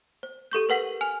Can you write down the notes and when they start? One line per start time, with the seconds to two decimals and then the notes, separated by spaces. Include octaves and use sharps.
0.23 C5
0.52 G4 A4 C#6 G6
0.69 A#4 B4 F#5 B6 F#7
1.01 G#5 F6 F7